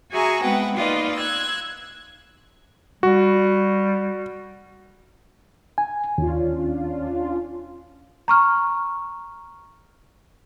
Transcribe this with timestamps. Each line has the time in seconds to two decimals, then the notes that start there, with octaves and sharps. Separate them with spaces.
0.11 F#4 G#4 E5 G#5 A#5 C#6
0.43 G#3 B3 C4 B4 F#5 G5
0.76 A#3 D#4 F4 B4 D5 D#5
1.15 E6 F#6 G#6
3.03 G3 F#4
5.78 G#5
6.18 D#2 C#4 D4 F4
8.28 A#5 C#6 F6